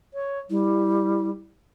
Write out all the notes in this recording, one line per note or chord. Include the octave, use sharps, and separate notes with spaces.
C#5
G3 E4